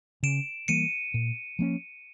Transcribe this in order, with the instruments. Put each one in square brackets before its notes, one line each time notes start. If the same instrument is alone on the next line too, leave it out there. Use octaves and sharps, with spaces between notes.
[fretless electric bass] C#3 [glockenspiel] D7 E7
[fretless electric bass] E3 G3 A#3 [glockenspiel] C#7 D#7
[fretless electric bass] A#2
F3 A#3 C#4